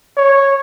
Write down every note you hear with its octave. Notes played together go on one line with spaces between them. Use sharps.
C#5